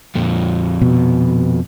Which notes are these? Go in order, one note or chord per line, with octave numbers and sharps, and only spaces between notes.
F2 A#2
B2